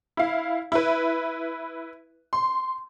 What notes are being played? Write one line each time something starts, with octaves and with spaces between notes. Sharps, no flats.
E4 F5
E4 B4
C6